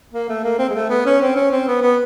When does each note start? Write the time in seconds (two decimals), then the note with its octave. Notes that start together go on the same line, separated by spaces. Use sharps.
0.13 A#3
0.29 A3
0.44 A#3
0.59 C4
0.69 G#3
0.75 A3
0.90 B3
1.06 C#4
1.21 C4
1.36 C#4
1.52 C4
1.68 B3
1.82 B3